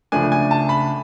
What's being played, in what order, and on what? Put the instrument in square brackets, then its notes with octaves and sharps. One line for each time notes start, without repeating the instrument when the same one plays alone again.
[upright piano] C#2 C#3 F3 A3 D4 G#5
G#5
A5
B5